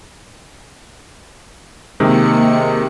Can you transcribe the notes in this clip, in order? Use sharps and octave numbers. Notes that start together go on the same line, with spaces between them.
C3 D#3 G#3 A#3 C#7